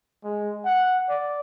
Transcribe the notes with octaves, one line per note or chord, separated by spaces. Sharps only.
G#3
F#5
D5